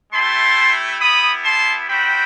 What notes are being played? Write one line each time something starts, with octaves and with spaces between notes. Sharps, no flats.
A3 E4 G4 A5 C6
B3 E4 G4 B5 D#6
A5 C6
G3 C4 F#4 G5 B5